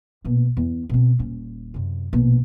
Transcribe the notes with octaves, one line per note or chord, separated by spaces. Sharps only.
A#1 B2
E2
B2 C4
D#1 C#4
F#2 C3
A#1 B2